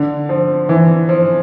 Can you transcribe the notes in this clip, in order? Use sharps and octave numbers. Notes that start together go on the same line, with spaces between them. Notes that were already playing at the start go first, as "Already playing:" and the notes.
Already playing: D3
F3
E3
F3